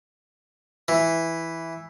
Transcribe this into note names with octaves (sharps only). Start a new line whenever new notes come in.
E3